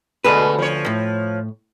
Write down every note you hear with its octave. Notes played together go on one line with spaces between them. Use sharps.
D2 B2 G#3 A4 B4
F3 C#5
A2